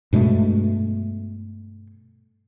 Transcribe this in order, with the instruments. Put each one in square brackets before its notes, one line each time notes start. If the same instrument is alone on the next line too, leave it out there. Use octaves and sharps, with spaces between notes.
[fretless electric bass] G2 B2 G#3 A3